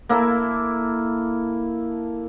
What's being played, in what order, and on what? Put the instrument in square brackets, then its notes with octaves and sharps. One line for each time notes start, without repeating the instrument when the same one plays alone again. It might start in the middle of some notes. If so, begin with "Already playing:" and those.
[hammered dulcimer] A#3 E4 A4